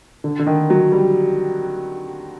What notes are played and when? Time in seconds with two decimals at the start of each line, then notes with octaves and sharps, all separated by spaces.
0.24 D3
0.39 D3
0.47 D#3
0.70 F#3
0.92 G3